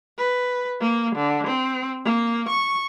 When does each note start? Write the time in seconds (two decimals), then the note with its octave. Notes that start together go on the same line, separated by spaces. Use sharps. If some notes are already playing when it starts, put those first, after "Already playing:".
0.18 B4
0.81 A#3
1.16 D3
1.47 C4
2.05 A#3
2.49 C#6